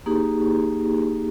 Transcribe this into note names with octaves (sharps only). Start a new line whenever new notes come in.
A#3 D#4 G4 G#4